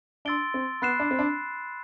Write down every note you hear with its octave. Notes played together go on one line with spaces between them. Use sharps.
D4 C6 E6 A6 D7 G7
C4
B3 B5 F#6 C7 E7
D4
C4
D4